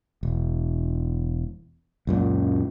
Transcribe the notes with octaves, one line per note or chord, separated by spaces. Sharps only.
E1
C#2 F#2 A#2